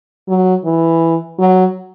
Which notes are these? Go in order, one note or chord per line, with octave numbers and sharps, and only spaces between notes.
F#3
E3
F#3